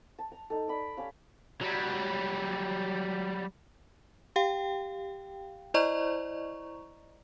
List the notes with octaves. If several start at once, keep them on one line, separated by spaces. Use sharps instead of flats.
A5
A#5
D#4 A4
D5 B5
C#4 G4 F5
F#3 G3
G4 F5 G5
E4 C5 D5 D#5 A#5 C#6